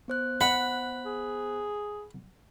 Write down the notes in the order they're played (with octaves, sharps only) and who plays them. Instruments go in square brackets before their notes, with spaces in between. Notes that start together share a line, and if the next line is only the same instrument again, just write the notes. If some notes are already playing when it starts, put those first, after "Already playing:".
[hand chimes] B3 C5 F#6
[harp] F#5 [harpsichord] B5
[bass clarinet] G#4